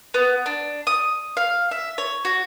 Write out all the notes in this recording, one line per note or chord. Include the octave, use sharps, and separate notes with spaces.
B3
D4
D#6
F5
E5
C#5
F#4